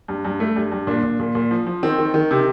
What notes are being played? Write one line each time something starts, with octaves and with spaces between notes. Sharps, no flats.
G2
G2
A3
G2
G2
A#2 D4
A#2
A#2
A#2
F3
F3
D#3 C4
D#3
D#3
C3